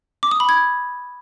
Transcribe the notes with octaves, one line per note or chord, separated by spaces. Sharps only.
D6
D#6
B5
G#6